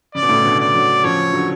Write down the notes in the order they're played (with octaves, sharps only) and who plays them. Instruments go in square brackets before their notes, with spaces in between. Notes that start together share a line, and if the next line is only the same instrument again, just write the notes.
[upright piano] C#3 [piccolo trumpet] D5
[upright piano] B2
A2 C#3
B2 D3
[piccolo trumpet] D5
[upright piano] D3 F#3
[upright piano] C#3 F3 [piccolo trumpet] C#5
[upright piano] D3 F#3